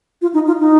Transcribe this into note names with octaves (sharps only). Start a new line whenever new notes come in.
F4
D#4
F4
D#4